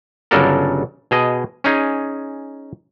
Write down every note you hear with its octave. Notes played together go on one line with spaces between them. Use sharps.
G1 C#3 F#3 D4 A4 A#4
B2 G#4 D#5
C#4 D#4 G#4